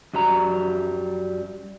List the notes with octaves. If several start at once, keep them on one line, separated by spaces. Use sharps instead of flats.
F#2 F#3 G3 A#5